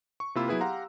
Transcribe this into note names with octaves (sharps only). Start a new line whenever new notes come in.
C#6
C3 A#3 E4 F4 B5 E6
F#3 B3 E4 G#4 B4
G4 F5 F#5 A#5 C6